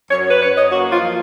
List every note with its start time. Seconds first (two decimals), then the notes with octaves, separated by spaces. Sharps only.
0.11 F#2 C#5
0.30 B4
0.41 F#2 C#5
0.56 D#5
0.71 A#3 F#4
0.91 F4
1.02 F3